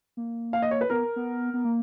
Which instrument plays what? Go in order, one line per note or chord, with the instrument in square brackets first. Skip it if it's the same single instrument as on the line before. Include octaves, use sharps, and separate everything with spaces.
[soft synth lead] A#3
[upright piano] F5
D#5
C#5
B4
[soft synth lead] B3 [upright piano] A#4
[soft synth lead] B3
B3
A#3